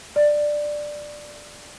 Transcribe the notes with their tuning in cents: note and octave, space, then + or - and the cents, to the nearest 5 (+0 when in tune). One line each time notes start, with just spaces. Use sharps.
D5 +10